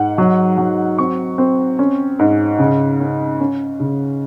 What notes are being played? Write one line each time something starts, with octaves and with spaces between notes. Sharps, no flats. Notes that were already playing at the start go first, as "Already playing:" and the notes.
Already playing: G#2 F#5
F#3
F#3
C4 C#6
C4
C#4
G#2
C#3
C#4
C#4
C#3